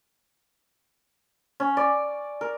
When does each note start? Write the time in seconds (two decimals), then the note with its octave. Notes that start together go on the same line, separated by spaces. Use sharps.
1.60 C#4
1.77 D5
2.41 A#4